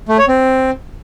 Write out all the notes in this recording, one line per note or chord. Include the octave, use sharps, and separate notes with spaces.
A3
C#5
C4